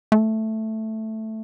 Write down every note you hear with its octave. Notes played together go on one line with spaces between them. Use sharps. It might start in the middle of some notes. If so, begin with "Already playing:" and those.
A3